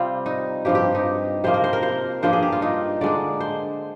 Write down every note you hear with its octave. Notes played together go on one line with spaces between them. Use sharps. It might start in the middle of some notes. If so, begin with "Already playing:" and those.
Already playing: C3 G3 C4 F4
D#4
G2 F3 C4 G4
G4
D#4
C3 F3 A#3 C5
A#4
C5
A#4
C5
G2 F3 A#3 D4 C5
G#4
G4
F4
D#4
D3 G#3 D4 D5
C5